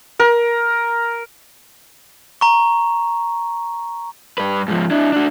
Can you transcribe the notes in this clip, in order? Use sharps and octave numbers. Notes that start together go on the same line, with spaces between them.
A#4
A#5 C#6
G2 B4
G#2 F3
D4 E4
D4 F#4